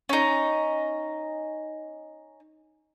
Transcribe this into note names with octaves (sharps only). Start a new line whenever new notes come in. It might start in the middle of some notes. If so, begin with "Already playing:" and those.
C#4 D#4